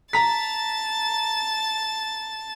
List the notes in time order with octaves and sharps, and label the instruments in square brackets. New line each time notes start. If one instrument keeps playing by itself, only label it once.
[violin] A5 A6 [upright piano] A#5 B6